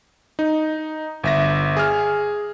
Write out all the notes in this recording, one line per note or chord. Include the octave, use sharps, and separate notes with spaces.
D#4
G1 E5 A#6
G#4 F6